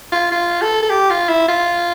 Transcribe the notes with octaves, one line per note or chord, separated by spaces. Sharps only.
F4
F4
A4
A4
G4
F4
E4
F4